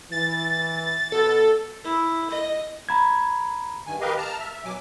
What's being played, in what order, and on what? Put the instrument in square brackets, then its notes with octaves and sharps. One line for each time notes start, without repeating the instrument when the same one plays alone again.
[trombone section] E3 [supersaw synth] A6
[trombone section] B2 [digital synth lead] A4
[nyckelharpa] E4
D#5
[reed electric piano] A#5 B5 G#6
[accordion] G2 D#3 G#5
G4 A#4 B4 D#5 F5
A5 A#5 F6
E5 F6
E5
F#2 B2 F#3 G#5 D6